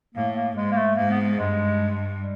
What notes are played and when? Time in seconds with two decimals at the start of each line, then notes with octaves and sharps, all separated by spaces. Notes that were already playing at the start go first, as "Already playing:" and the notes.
0.15 A2 A#3
0.35 A#3
0.55 G#2 G#3
0.71 A#3
0.76 A3
0.96 G#2 A#3
1.10 B3
1.37 G2 G#3
2.18 G3